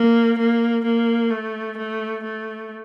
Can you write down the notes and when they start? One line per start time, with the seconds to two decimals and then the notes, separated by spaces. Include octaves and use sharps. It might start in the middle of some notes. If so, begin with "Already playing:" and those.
Already playing: A#3
0.38 A#3
0.85 A#3
1.31 A3
1.77 A3
2.24 A3